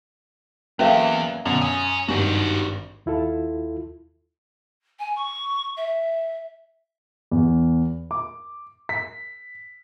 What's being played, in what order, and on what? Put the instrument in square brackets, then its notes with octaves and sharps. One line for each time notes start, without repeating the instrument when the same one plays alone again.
[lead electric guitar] E2 [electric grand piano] F#3 A#3 [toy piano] C#4 E5 F5 [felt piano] A4 B4
[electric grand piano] F#2 [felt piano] B2 [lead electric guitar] D3
[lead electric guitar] C#5 G#5 [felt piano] D#6
[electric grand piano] G#1 [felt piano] G2 [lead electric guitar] D#4 F#4
[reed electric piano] D#2 E4 F4 A4
[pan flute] G#5
C#6
E5
[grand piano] E2
D6
B6